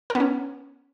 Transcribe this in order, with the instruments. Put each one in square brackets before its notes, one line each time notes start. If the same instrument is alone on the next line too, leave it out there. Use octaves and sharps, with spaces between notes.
[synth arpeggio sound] A#4
B3
C#4